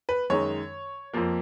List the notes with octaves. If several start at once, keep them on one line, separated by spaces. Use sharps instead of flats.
B4
F#2 D#3 G#3 C#5
F2 F3 A#3